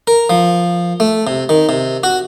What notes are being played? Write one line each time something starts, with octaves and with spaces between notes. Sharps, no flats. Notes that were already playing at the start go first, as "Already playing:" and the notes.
A#4
F3
A3
C3
D#3
C3
F#4